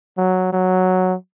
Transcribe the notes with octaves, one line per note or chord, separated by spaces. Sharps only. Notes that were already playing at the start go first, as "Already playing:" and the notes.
F#3
F#3